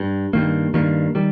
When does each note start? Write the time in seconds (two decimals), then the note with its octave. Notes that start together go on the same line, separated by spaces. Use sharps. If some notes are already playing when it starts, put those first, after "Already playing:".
Already playing: G2
0.33 G2 D#3 A#3
0.74 G2 D#3 A#3
1.15 D#3 G3